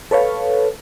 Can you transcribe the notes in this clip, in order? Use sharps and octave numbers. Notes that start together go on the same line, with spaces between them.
A4 B4 C#5 F5